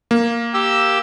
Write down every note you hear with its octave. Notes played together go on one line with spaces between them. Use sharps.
A#3
G4 E6